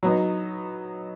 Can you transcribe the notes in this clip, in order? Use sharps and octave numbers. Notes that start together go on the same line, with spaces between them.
F#3 B3 D#4